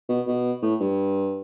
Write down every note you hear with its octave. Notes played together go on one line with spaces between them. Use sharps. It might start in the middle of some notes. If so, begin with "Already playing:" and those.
B2
B2
A2
G2